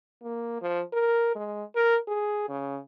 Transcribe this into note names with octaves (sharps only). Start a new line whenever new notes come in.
A#3
F3
A#4
G#3
A#4
G#4
C#3